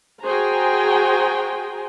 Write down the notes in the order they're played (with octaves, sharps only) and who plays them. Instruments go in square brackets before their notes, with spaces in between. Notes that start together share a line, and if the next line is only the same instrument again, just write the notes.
[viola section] F#4 G#4 C5 G5 G#5 A#5